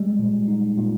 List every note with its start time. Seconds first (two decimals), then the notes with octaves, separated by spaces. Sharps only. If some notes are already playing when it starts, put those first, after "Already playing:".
Already playing: G3 G#3
0.19 A#2
0.48 D#4
0.77 A#2